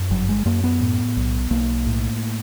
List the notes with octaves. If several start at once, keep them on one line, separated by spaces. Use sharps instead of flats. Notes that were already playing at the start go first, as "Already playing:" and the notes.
Already playing: F#2
G1 F#3
G#3
F#2 A#3
B3
A2
B1
B1 A#3
A2